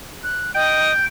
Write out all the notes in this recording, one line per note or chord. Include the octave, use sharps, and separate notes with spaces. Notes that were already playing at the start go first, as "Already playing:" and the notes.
F#6
D#5 G5